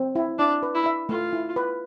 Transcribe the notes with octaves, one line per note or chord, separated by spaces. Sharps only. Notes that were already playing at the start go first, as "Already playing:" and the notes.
Already playing: C4
E4
D4 E4
B4
E4
E5
A3 F4
E4
B4